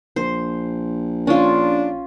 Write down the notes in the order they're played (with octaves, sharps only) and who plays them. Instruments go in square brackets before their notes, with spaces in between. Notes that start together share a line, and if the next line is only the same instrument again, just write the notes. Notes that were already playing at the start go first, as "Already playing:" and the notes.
[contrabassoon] A#1 [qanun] C5
[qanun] C#4 F4 [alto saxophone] D4